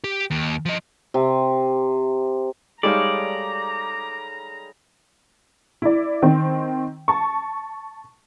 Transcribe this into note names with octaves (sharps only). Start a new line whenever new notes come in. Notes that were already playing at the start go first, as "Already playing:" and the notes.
G4
D#2
F3 D#5
C3
G3 G#3 D#4 A4 C#5 D5 F5 A#5
E4 D5
D#3 C4
A5 C#6